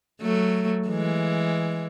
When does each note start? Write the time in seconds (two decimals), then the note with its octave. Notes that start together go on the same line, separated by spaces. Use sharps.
0.21 F#3 A3
0.88 E3 G#3